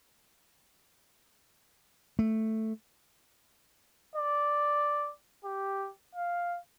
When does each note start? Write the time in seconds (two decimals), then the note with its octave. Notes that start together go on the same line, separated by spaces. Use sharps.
2.19 A3
4.16 D5
5.45 G4
6.15 F5